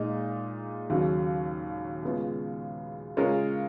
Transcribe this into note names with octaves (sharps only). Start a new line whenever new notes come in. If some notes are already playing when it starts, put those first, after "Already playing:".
Already playing: A#2 G#3 D#4
D#2 C#3 F#3
C#3 G#3 B3 F4
C#3 G#3 C#4 F4 A#4